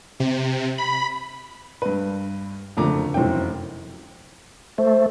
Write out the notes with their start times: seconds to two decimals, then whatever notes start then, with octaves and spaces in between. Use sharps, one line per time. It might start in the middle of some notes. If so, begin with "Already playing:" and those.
0.20 C3
0.78 B5
1.82 G2 B4
2.77 F#1 F2 D3 A3 A#5 D6
3.14 F1 F#2 E3 C4 G5
4.78 A3 C5